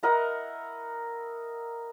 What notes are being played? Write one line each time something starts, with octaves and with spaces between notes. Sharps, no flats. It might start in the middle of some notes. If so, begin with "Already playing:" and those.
E4 A#4 D#5 F#5